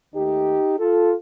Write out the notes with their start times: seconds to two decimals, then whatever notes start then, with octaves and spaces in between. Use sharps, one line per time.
0.13 D#2 D#3 A3 D#4 G4
0.78 F4 A4